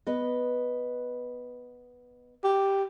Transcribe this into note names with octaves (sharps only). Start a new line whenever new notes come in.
B3 B4 D#5
G4